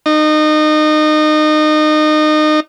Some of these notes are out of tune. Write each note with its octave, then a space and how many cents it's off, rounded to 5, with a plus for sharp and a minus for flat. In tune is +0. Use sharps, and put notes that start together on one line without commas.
D#4 -25